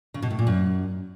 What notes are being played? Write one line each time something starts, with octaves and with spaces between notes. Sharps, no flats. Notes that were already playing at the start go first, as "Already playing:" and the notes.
C#3
B2
A2
A#2
F#2